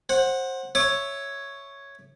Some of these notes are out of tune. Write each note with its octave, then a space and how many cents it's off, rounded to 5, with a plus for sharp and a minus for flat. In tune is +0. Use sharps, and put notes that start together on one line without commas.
C5 +20 F#5 -5
C#5 +0 E5 +0 D6 +45